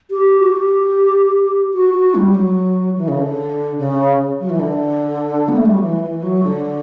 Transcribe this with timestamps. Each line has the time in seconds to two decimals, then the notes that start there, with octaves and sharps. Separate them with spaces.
0.10 G4
0.39 F#4
0.51 G4
1.73 F#4
1.94 F#4
2.14 G3
2.30 G3
2.34 F#3
2.96 E3
3.08 C#3
3.17 D3
3.78 C#3
4.40 F#3
4.49 E3
4.59 D3
5.48 B3
5.57 A3
5.65 G3
5.73 F#3
5.81 E3
6.02 E3
6.22 F#3
6.43 D3